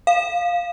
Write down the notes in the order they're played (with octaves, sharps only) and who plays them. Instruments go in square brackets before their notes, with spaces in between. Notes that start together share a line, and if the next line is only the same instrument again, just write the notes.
[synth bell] F5